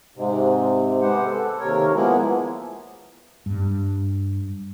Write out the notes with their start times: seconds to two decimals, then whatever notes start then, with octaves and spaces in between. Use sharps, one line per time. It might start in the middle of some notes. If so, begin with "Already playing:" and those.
0.16 G#2 C3
1.02 G#3 B3 G4 C5 F#5
1.25 A4
1.60 D#2 C3 A#4 C#5
1.94 F3 G#3 A#3 B3 E4
3.46 G2